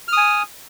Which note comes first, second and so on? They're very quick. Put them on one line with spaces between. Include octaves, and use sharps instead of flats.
F6 D#6 G#5